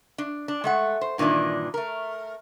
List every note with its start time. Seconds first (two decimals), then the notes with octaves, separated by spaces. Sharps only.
0.18 D4
0.48 D4
0.64 G#3 A3 F#5
1.01 C5
1.18 G2 A#2 D#3 E3 D4
1.74 A3 A#4